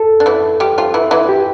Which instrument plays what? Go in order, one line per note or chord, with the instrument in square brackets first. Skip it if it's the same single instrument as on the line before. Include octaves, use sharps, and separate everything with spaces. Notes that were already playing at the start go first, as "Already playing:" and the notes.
Already playing: [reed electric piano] A4
[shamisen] D4
E3 E4
G3 G4
F3 F4
E3 E4
E3 E4
[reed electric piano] G4